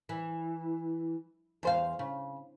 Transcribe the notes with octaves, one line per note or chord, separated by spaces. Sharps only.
E3
E2 C5 F5
C#3